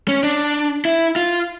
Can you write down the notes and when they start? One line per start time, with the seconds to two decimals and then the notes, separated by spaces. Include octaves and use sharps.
0.08 C#4
0.23 D4
0.85 E4
1.16 F4